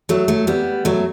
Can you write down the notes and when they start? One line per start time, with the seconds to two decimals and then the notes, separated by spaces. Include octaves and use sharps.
0.09 F#3 A3
0.28 F#3 A3
0.47 G3 B3
0.85 F#3 A3